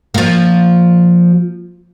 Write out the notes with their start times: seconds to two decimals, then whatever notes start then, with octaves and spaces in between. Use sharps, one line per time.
0.14 F3 A#3